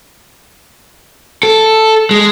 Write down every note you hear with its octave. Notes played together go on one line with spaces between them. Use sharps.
A4
G#3